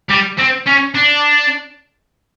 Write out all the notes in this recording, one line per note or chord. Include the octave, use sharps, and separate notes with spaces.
G3
C4
C#4
D4